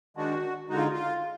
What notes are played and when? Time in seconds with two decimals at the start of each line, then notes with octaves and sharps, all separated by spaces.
0.17 D#3 G#3 D4 F#4
0.69 D3 G#3 D#4 F#4
0.77 F4
0.93 F4